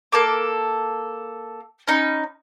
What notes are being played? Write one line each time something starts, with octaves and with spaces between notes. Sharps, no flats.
A#3 A4 D6
C#4 D#4 B5